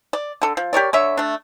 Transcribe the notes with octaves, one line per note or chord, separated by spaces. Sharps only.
D5
D3 A4
F3
G4 A#4 C#5 D5
D3 C#5 E5
A3 D4